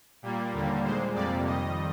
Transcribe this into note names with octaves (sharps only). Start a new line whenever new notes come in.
A#2 G3 A#3
D#2 D3 G3 A#3
A#2 G#3 C5
F2 C3 G3 A#3 D5
F2 D#3 G3 D#5